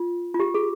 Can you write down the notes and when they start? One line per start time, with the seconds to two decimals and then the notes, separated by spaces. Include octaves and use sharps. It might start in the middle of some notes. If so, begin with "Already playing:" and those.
Already playing: F4
0.34 F4
0.40 G4
0.54 G#4